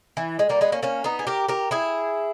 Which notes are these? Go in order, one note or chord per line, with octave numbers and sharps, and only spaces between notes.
E3
G#3
G3 A#3
G#3 B3
A#3 C#4
A#3 C#4
B3 D#4
G#4
G4 A#4
G4 A#4
E4 G#4